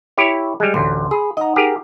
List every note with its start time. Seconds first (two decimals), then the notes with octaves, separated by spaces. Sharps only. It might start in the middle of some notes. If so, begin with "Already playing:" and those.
0.18 E4 G4 C#5
0.60 G3 G#3
0.74 A1 D2 C6
1.11 G#4 B5
1.37 D#4 D#5 F#5 A#5
1.56 G4 G#4 A#4